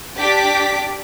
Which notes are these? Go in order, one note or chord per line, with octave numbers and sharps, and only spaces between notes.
D4 G4 D6 B6